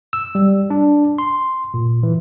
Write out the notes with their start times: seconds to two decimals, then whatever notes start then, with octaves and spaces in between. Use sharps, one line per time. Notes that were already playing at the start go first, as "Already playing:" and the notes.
0.13 E6
0.35 G3
0.70 D4
1.18 C6
1.74 A#2
2.03 E3